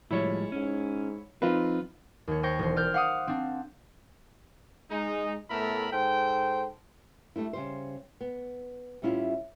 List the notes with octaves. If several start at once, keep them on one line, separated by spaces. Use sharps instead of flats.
A2 F3 G3 G#3 E4 C#5
G#2 C#4
F3 C4 D#4 F4 B4
D#2 C#5
C5 C#5 G5 C#6 A#6
E1 C5
D5 D6 F6 G6
F5 F#5 D6 D#6
C4 D4
G#3 D#4
A2 A3 B3 A#4 E5 B5
G#2 A4 C5 G5
G3 A3 D4 E4
C#3 G3 C5
B3
A2 G3 C#4 E4 F4